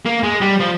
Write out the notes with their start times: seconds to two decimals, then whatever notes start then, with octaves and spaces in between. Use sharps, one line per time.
0.05 A#3
0.23 G#3
0.41 G3
0.60 F3